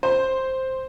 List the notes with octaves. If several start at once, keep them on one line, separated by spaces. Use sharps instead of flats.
C5